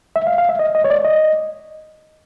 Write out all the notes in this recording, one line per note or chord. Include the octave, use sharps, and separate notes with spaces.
E5
F5
F5
E5
D#5
D#5
C#5
D5
D#5